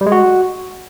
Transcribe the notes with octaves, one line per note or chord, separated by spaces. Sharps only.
G3
G#3
F#4